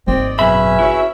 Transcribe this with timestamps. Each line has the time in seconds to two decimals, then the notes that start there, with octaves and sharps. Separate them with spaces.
0.07 G#1 A#3 C4 D5 D#5
0.39 F#2 B2 C#4 G#4 B4 E5 B5
0.79 E4 F#4 C#5